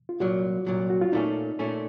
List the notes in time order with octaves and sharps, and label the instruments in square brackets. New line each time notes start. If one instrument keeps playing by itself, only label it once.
[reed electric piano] F4
[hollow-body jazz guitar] C2 A#2 F#3 [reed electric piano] F#4
[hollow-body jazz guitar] C2 A#2 F#3
[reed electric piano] F#4
F4
[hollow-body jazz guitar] A#2 A3 C#4 [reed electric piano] D#4
[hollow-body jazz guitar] A#2 A3 C#4